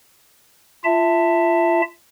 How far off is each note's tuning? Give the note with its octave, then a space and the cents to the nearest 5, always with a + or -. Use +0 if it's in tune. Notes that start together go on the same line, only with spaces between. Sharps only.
F4 -25 E5 +0 A5 +15